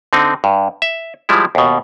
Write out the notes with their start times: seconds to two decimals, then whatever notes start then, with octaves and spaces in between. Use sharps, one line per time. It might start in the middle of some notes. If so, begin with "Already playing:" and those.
0.13 D3 C4 D#4
0.44 G2
0.82 E5
1.29 F3 G3 G#3 E4
1.55 D#2 B2